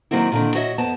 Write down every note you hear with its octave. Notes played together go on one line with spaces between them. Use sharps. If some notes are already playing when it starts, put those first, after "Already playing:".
D#3 F3 F#3 A#3 C4 E4
A#2 D3 D#3
F#4 C#5 D#5 E5
F2 B3 A5